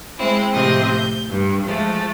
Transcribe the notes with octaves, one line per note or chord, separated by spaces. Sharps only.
G#3 C4 E4
A2 C3 F3 C4 D#5 C6
G6
G2
F3 G#3 A3